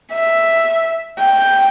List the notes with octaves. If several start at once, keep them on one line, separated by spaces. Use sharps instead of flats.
E5
G5